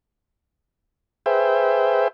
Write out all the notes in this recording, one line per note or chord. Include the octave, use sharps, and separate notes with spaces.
G#4 B4 C5 E5 G5